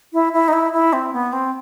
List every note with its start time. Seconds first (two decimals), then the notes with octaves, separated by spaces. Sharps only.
0.13 E4
0.33 E4
0.48 D#4
0.53 E4
0.73 E4
0.93 C4
1.13 B3
1.33 C4